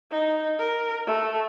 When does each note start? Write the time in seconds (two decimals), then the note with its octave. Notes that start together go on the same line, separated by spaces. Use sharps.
0.11 D#4
0.59 A#4
1.06 A3